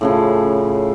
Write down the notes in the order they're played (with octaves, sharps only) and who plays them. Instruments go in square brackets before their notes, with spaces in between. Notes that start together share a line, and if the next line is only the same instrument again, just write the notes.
[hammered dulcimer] A2 C#3 F3